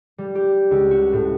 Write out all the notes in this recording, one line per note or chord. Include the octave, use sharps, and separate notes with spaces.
G3
G4
C#2
F#4
A2